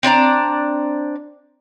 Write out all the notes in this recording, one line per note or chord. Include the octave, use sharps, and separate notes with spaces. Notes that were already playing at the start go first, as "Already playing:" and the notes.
C4 D4 D5 A#5